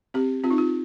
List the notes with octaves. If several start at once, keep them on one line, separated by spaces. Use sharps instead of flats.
C4 G4
C4 F4
D#4
F4